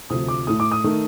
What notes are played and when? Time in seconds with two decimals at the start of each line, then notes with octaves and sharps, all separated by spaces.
0.10 D2 C3 F3 A3 D#6
0.28 D6
0.47 A2 A3 D#6
0.60 D6
0.72 D#6
0.84 D#3 A3